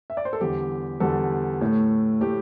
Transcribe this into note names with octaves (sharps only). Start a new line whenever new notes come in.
E5
D5
C5
A4
E2 D3 G3 G4
E2 D3 G3 A4
A2 A3
A2 A3 G4